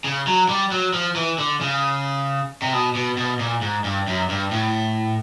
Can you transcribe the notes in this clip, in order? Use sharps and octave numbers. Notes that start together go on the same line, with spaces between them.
C#3
F#3
G3
F#3
F3
E3
D3
C#3
C3
B2
B2
B2
A#2
G#2
G2
F#2
G2
A2